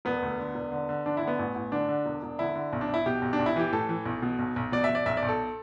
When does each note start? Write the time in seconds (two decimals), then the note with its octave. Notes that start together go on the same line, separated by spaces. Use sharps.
0.05 E1 B3
0.22 D2
0.39 D3
0.55 E1
0.72 D3
0.89 D3
1.06 D3 D4
1.17 E4
1.22 D3
1.28 B3
1.39 A1
1.55 A1
1.72 D3 D4
1.89 D3
2.06 E1
2.23 E1
2.39 D3 E4
2.55 D3
2.73 B1
2.81 D4
2.89 B1 E4
3.06 B2 G4
3.22 B1
3.33 D4
3.39 B1
3.46 E4
3.56 E3 G4
3.72 A2 A4
3.89 E3
4.06 B1
4.22 B2
4.39 B1
4.56 B1
4.72 B2 D5
4.84 E5
4.89 B2
4.95 D5
5.06 B1 E5
5.17 D5
5.23 B1
5.28 A4